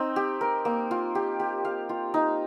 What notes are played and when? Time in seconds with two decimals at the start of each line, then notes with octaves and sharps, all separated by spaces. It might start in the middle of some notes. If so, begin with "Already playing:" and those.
Already playing: C4 D#4
0.16 G4
0.41 A#4
0.65 A#3
0.91 F4
1.15 G4
1.40 G4
1.65 F5
1.89 F4
2.14 D#4